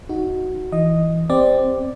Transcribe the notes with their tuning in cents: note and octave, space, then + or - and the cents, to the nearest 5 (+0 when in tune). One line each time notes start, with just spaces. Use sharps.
D#4 +20 F#4 +0
E3 +5 D#5 +0
C4 +0 G4 +10 D5 +5